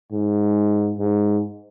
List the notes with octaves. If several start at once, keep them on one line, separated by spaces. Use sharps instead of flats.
G#2
G#2